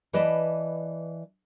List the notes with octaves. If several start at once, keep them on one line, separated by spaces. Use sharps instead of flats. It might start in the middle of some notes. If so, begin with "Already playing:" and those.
E3 B4 D5 D#5 A5